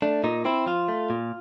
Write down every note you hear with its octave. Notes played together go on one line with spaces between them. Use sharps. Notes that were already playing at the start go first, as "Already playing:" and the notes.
A3 D4
A#2 D#4
C4 E4
F3 F4
A3
A#2